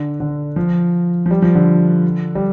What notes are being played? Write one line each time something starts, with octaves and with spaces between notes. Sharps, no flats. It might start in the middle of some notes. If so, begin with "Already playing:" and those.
Already playing: D3
D3
F3
F3
G3
F3
D3
G3